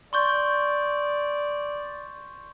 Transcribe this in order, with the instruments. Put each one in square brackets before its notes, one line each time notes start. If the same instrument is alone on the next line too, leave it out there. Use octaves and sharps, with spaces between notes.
[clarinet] D5 [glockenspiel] C6 C#6 G6